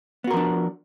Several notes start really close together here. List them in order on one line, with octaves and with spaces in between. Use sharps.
B3 F#4 A#4 F3 D4